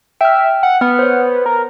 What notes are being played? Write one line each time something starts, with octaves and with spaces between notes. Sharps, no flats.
E5 G5 F6
F#5
B3 F#5 F6
C5 C#5
A#4